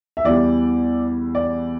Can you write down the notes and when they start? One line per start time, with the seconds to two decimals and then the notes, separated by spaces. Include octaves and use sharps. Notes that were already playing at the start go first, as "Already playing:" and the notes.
0.17 E5
0.24 E2 E3 G3 D5
1.35 D5